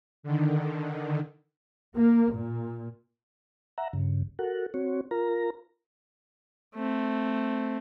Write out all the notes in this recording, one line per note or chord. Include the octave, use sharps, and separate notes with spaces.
D3 D#3
A#3
A#2
E5 F#5 A#5
G2 C#3
F#4 A4 A#4 F#5
C4 F#4 C#5
F4 A#4 A#5
A3 C4